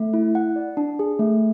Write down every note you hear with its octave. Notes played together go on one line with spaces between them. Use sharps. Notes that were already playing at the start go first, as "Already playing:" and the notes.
Already playing: A3
E4
F#5
D5
D4
G#4
A3